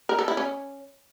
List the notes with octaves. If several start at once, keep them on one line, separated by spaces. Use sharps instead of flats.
A#4
A4
E4
C#4